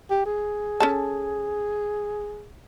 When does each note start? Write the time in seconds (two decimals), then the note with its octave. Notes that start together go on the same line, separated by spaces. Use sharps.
0.10 G4
0.25 G#4
0.80 C#4 A4 A5